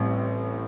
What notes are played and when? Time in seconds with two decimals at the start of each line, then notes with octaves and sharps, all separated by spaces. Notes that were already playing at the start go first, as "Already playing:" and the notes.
Already playing: A1 A2 G3 C4